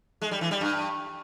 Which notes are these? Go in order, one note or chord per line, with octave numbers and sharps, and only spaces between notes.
G#3
G3
E3
G3
G2